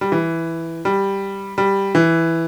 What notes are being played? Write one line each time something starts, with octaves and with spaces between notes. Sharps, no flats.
G3
E3
G3
G3
E3